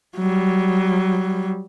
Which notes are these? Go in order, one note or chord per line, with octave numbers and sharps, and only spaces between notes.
F#3 G3